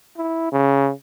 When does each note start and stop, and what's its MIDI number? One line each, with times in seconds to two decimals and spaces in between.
0.17 0.51 64
0.52 0.91 49